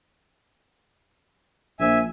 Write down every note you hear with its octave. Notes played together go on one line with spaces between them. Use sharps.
A#1 E5 G#5